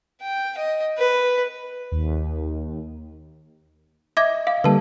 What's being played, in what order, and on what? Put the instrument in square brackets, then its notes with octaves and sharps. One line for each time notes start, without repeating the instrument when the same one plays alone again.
[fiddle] G5
D#5
B4
[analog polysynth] D#2
[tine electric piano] D#5 [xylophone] E5 D6 G#6
[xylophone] F5
[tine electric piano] D3 G3 A#3 [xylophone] B4 A5